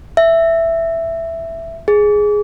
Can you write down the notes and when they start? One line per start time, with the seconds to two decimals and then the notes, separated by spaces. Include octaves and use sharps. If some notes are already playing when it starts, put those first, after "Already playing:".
0.17 E5
1.88 G#4